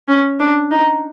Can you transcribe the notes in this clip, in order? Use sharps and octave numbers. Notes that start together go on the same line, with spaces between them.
C#4
D4
D#4